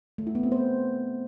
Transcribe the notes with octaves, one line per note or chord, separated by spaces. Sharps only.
A3
E4
B3
C4
C5